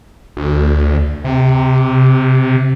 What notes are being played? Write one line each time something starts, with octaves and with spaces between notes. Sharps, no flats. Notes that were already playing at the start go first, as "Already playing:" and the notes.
D2
C3